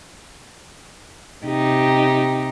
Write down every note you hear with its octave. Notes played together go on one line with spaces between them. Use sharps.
C3 D#4 G4